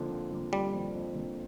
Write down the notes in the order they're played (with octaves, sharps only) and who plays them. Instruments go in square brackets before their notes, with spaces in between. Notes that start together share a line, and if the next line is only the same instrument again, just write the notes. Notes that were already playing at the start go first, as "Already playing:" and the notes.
Already playing: [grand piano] F2 D3 F3 A#3
F2
D3 F3 A#3
[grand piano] F2 [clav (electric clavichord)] G3
[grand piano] D3 F3 A#3
F2
D3 F3 A#3